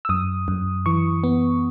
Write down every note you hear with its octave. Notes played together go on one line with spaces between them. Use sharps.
E6
F#2 D#6
F#2
E3 C#6
B3